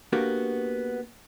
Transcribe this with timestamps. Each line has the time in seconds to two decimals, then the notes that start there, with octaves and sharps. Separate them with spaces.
0.13 A#3 B3 D4 F#4 G4 A#4